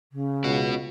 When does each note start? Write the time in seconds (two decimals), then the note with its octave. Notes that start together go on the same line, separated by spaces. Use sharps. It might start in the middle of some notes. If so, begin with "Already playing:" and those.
0.12 C#3
0.44 C#2 B3 F#4